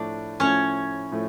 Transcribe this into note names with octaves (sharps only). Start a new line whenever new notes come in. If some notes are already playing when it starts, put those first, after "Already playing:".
Already playing: A2 F3 A3 D4 D5
A2 F3 A3 C#4 C#5
A2 F3 A3